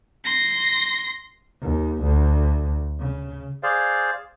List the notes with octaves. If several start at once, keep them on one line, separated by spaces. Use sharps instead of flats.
C6 A#6
D#2
D2
C#3
G#4 C5 D5 F5